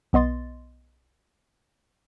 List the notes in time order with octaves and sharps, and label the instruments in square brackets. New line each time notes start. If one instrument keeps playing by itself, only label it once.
[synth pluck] B1 B3 D#5 C6 A6